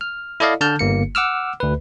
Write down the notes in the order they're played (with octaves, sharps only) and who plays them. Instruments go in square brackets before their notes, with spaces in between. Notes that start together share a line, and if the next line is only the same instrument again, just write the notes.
[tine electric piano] F6
E4 A4 D5 D#5 F5
D3 A5 F6 G6
G1 A#3 C#7
F#5 D6 E6 F6
D2 B4